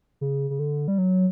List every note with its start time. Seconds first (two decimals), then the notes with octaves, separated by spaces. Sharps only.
0.21 C#3
0.50 C#3
0.59 D3
0.88 G3
0.98 F#3